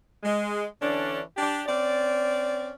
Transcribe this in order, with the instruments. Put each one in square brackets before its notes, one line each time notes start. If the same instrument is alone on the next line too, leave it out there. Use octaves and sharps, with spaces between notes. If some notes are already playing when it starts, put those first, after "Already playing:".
[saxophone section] G#3
D3 E3 C#4 D4
D4 G4
C4 C#4 D5